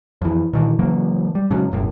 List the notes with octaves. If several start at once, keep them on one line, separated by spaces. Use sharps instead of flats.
F2 E3
A#2 D#3 E3
C#3 E3 F#3 A#3
G3
G#2 C#3 F#3
E1 F#2 A2